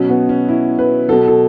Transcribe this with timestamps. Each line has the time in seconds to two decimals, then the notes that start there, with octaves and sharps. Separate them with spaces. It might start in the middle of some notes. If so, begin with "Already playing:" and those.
Already playing: B2 F#3 C#4
0.09 B3
0.29 C#4
0.49 E4
0.79 B4
1.08 B2 F#3 A4
1.28 A4